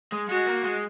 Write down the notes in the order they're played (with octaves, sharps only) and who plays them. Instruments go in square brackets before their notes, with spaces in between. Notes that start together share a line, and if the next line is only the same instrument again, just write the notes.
[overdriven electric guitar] G#3
[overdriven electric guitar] G#3 [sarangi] F#4
[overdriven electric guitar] A#3
G#3